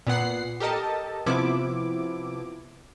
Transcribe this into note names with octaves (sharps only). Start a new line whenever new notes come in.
A#2 B3 F#5 C7
G4 A4 A#4 D#5 A5
C3 F3 B3 E4 D6